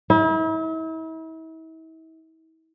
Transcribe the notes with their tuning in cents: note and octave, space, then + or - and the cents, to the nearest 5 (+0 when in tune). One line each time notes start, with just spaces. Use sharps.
E4 -40